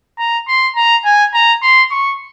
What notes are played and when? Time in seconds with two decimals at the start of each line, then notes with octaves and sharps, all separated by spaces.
0.19 A#5
0.48 C6
0.76 A#5
1.05 G#5
1.34 A#5
1.63 C6
1.91 C#6